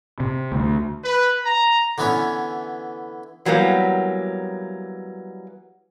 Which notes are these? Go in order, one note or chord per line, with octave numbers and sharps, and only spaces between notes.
C3
D2
B4
A#5
D3 E3 B3 C#4 C#5
E3 F#3 G3 A#3 B3